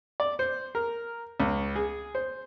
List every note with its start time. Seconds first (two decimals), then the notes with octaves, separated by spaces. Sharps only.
0.20 D5
0.39 C5
0.75 A#4
1.40 C#2
1.76 G#4
2.15 C5